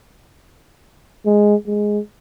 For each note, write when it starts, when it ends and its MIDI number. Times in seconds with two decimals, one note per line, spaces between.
1.26 1.55 56
1.67 1.99 56